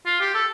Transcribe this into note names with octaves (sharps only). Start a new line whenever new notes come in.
F4
G4
A4